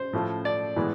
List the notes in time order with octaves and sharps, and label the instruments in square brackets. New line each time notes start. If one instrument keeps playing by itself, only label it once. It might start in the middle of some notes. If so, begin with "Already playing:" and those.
Already playing: [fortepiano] C5
A2 F3 A3
D5
A2 E3 G#3 B3